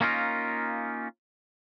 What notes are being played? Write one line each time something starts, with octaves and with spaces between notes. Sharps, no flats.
A#3 C#4 D#4 F4 A#4